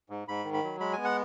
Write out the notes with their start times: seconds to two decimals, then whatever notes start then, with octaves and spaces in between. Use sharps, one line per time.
0.10 G#2
0.28 G#2 B5
0.45 D#3
0.54 B5
0.64 F#3
0.80 G#3 B5
0.93 B3 G#5
1.05 F#5